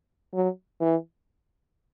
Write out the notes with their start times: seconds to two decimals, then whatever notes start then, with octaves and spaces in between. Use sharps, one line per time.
0.34 F#3
0.81 E3